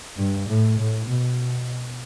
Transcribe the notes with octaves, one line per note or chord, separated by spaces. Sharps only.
G2
A2
A2
B2